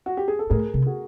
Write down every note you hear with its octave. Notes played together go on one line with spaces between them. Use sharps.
F#4
G4
G#4
A4
A2 G#4 A#4
C3
F#4 G#4